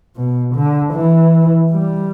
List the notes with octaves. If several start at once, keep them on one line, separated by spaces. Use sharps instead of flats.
B2
D3
E3
G3